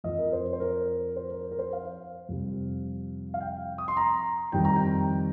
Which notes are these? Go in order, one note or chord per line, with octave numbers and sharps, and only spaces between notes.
F2 F3 D#5
A#4
C5
C5
A#4
C5
A#4
A#4
C5
F5
F2 C3 G3
F5
G5
D#6
C6
A#5
F2 D#3 G3 G5
A#5
G5